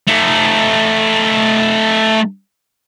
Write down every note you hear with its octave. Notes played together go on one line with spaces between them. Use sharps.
A3 D#4